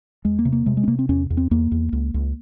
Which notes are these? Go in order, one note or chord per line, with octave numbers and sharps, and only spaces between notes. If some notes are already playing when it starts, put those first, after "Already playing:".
E2 G#3
A#3
C3
A#3
C3 G#3
G#3
C4
C3 A#3
C4
E2 C#4
E2
C4
E2 A#3
E2
C#2
C#2